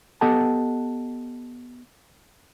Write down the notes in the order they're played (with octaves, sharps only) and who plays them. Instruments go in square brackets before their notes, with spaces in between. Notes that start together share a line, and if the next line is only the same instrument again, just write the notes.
[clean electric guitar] B3 G4 A4 D#5 F#5 A5